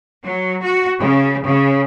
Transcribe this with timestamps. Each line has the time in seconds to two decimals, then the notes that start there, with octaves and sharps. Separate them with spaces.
0.25 F#3
0.63 F#4
1.01 C#3
1.45 C#3